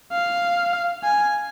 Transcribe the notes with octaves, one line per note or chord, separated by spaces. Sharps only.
F5
G#5